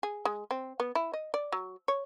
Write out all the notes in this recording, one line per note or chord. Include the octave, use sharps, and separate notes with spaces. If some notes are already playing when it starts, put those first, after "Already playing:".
G#4
G#3
C4
B3
E4
D#5
D5
F#3
C#5